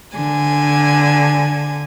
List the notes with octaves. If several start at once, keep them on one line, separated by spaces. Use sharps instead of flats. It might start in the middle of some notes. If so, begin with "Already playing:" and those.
D3 G#5